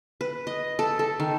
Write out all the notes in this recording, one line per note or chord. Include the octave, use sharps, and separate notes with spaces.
B4
D#5
A4
A4
D#3